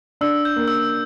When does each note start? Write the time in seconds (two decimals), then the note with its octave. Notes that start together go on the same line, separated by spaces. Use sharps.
0.21 D4 E6
0.45 G6
0.56 A#3
0.68 E6